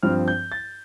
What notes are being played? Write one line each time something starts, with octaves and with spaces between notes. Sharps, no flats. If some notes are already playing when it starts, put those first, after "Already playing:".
G2 F3 C4 F6
G6
A6